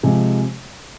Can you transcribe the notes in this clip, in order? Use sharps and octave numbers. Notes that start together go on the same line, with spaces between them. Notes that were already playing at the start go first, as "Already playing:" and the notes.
C3 F3 G#3 G#5